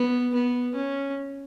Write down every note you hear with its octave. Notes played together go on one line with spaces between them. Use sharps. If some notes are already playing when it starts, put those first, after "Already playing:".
Already playing: B3
B3
C#4